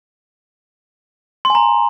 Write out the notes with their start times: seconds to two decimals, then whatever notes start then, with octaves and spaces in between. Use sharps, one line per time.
1.45 C6
1.50 G#5
1.55 A#5